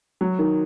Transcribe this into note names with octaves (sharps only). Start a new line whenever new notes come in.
F#3
D#3